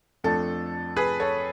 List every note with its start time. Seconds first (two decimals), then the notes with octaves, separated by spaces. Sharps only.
0.24 F2 F3 A3 D4 A4
0.96 G#4 B4
1.20 A4 C#5